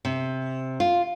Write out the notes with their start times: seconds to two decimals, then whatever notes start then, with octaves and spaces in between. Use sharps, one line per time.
0.05 C3
0.80 F4